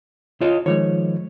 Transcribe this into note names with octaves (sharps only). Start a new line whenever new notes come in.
F4 C#5 D#5
D#3 F3 G#3 C#5